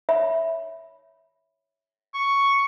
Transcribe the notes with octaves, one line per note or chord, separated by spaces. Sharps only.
C#5 E5 B5
C#6